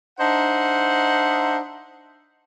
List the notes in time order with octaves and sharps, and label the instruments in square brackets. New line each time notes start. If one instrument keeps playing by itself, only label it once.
[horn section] D4 D#4 C5 E5 F#5